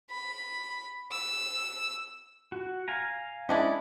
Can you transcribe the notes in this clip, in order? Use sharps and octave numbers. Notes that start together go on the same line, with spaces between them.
B5
E6
F#4
F5 G#5 A#5
G#3 C#4 D4 E4 A#4 B5